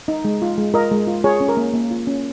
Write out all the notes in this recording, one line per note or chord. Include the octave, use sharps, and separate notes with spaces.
D#4
G#3
F4
G#3
F4 A#4 D#5
G#3
F4
F4 G#4 C#5
C#4
A#4
A#3
A#3
F4
C#4